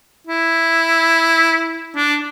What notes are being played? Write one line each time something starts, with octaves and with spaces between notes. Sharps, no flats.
E4
D4